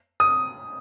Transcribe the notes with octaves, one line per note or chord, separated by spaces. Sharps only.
D#6